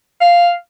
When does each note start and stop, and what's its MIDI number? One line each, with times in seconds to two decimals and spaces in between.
0.21 0.52 77